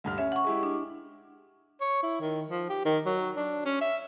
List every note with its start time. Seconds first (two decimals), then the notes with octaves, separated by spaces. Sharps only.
0.04 D2 G2 F6
0.18 C#4 E5
0.32 F#5 C#6
0.44 G#3 E4 G4
0.63 D4
1.81 C#5
2.03 E4
2.21 D#3
2.50 F3
2.69 G4
2.85 D#3
3.06 F#3
3.36 D4
3.65 C#4
3.81 E5